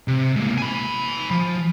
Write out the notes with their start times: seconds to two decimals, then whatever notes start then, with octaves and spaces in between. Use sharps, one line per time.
0.08 C3
0.36 G#2 A#3
0.58 G#5 B5
1.31 F3